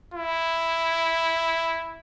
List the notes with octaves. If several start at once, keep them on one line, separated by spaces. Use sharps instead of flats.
E4